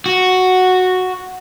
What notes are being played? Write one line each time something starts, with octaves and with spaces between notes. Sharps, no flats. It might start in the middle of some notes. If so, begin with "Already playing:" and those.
F#4